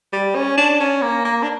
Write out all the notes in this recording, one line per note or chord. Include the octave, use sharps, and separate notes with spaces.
G3
C#4
D4
C#4
A#3
A#3
D4